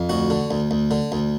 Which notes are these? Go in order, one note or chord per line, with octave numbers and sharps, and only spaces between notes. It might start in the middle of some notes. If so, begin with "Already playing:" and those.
Already playing: F2
D2 F#4
D3
D2
D2
D3
D2